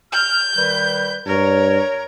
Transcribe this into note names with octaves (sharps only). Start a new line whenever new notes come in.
F6 G6
D#3 G3 B4
G2 A#4 C#5